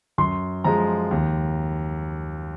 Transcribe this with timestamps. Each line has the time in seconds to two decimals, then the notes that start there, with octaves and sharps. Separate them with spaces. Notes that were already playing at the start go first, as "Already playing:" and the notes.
0.18 F#2 C6
0.64 F3 G#3 A#5
1.11 D#2